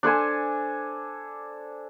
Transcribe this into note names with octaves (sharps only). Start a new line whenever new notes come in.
D4 A4 C5 G#5